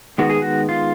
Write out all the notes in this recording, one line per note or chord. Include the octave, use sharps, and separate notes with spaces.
D#3 G#3 B3 F#4
G#4
F#4
F4